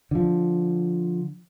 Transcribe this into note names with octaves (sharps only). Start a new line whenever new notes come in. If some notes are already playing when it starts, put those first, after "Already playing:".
D3 F3